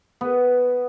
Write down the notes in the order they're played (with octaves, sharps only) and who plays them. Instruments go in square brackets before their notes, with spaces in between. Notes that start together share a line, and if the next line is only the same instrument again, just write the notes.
[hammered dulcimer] B3